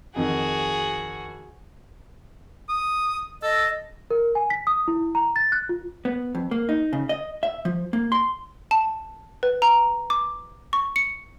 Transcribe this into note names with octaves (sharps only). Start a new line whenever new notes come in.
F2 D#3 F#4 G#4
D#6
A4 D#5
A#4
G#5
B6
D#6
E4
A#5
A6
F#6
F4
B3
F2
A#3
D#4
C#3
D#5
E5
F3
A#3
C6
A5
B4
A#5
D6
C#6
C#7